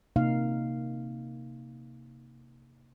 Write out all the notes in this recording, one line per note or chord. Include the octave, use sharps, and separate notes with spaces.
C3 A#3 D#4 F5